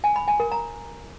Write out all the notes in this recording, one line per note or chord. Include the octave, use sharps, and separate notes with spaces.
G#5
B5
G#5
A#4
A#5